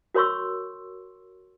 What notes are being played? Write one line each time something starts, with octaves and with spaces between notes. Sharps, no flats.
F#4 A#4 C#5 C6 C#6 E6